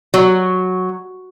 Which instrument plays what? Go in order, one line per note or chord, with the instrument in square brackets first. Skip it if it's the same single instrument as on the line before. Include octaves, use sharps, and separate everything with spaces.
[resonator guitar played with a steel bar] F#3